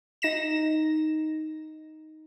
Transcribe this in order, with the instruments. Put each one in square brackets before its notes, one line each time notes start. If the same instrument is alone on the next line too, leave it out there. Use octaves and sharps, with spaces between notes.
[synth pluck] D#4 A#6 E7